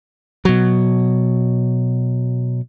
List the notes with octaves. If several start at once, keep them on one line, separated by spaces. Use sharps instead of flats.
B2 F#3